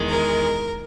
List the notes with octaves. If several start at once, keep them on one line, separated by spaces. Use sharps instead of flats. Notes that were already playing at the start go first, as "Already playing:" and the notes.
Already playing: E2 D#3 G#3
A#4